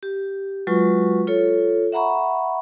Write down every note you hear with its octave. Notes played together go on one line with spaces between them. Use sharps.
G4
F#3 G#3 F4 F#4 B4 C#6
F4 A4 C#5
E5 F#5 A#5 B5 C#6